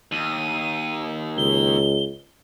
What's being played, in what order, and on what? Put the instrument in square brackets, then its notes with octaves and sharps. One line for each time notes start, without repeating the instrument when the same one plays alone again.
[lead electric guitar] D#2 [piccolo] D#7
[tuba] C#2 [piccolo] G7